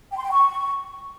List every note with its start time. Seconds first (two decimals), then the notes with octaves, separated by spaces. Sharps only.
0.11 G5
0.18 C6
0.25 G5
0.32 C#6